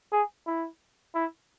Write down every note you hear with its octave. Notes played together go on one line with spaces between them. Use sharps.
G#4
E4
E4